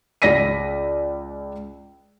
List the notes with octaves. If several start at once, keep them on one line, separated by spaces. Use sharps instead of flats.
C#2 D5 A#6 B6 D#7